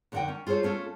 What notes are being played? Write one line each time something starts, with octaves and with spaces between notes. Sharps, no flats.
F2 D3 D#4 A#4 F#5 G5
C#4
F4 G#4 A4 C5 C#5
A3 C#4 F4 A4